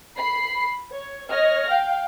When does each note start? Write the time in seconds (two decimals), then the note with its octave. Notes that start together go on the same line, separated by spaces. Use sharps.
0.17 B5 C7
0.92 C#5
1.29 C#5 D#5 F6 A#6
1.69 F5 G5